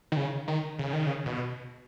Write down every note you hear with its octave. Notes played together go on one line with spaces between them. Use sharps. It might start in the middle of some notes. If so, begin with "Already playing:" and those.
D#3
C#3
D#3
C#3
D#3
C#3
B2